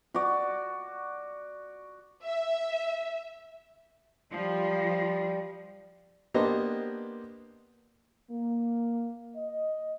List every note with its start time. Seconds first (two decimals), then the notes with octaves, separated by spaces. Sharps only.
0.14 F#4 D5
2.23 E5
4.32 F3 G3
6.34 A#3 B3 D4 G4 C5 D#5
8.31 A#3
9.36 D#5